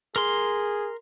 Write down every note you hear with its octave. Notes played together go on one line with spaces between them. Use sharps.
G#4 A#4 C6